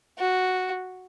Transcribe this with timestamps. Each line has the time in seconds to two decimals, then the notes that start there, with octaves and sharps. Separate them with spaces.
0.19 F#4